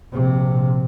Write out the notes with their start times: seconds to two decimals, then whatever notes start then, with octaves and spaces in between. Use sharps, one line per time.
0.12 A#1 C3